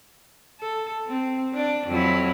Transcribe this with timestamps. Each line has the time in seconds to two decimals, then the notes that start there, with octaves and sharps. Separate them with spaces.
0.60 A4
1.08 C4
1.53 D4 D5
1.87 F2 F#3 E4